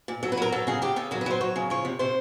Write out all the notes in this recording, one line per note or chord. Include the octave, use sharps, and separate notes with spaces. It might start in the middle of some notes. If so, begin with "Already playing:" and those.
A#2
F#3 A4
B4
F#3 A#4
F#3 A4
C#3 G#4
C#3 G4
C#3 A4
F#3 A#4
B4
F#3 C5
F#3 C#5
C#3
F3 C#5
C3
C3 C5